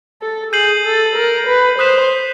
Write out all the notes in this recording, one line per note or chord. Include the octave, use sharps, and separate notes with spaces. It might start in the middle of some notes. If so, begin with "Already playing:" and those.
A4
G#4 G6 C7 D#7 F#7
A4
A#4
B4
C5 D#6 F#6 B6 E7